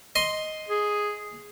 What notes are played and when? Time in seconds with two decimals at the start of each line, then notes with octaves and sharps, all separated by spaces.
0.16 D#5 C6
0.69 G#4